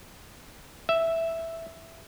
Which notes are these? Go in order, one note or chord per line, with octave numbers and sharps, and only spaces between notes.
E5